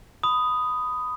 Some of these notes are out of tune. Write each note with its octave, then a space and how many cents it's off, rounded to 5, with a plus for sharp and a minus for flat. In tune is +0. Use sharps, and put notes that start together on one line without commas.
B5 +20 D#6 +0